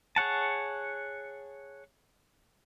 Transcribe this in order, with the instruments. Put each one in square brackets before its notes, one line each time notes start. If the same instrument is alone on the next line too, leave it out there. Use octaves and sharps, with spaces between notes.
[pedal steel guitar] G#4 C#5 F#5 A5